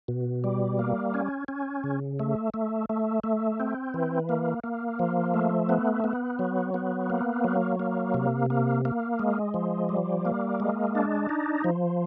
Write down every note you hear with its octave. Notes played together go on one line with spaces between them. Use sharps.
B2
G3
A#3
C#4
C#4
C#3
A3
A3
A3
A3
C4
E3
A#3
A#3
F3
A3
B3
B3
F#3
B3
A#3
F#3
A#3
C3
A#3
A#3
G#3
F3
G3
A#3
G#3
D4
D#4
F3